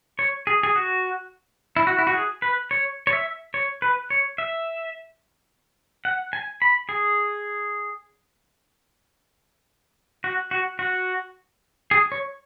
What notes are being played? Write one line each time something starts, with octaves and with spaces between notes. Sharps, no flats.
C#5
G#4
G#4
F#4
E4
F#4
E4
F#4
G#4
B4
C#5
C#5
E5
C#5
B4
C#5
E5
F#5
G#5
B5
G#4
F#4
F#4
F#4
G#4
C#5